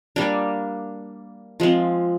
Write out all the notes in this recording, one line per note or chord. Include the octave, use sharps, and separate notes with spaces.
G3 A#3 D4
F3 G#3 C4